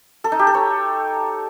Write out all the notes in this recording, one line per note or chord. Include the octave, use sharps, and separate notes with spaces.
A4
D#4
G4
A4
C#5